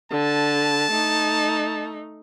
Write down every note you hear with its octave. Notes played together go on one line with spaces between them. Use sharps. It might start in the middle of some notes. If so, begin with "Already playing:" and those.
D3 A5
A3 D#4